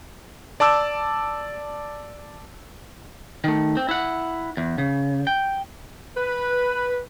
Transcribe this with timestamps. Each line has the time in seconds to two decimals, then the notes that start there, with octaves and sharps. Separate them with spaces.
0.60 D5 A5 D6 E6
3.44 D#3 A3
3.77 C4
3.89 E4 F#5
4.57 E2
4.78 C#3
5.27 G5
6.17 B4